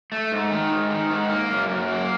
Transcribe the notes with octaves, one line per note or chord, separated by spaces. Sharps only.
A3
G#2
D#3
G#2
D#3
G#2
A#3
F#2
F#2
A#3